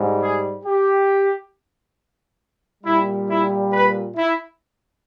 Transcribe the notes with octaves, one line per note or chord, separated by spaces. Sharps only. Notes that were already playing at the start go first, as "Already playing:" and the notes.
Already playing: G#2 G3
G#4
G4
A#2 G3 E4
E4
B4
E4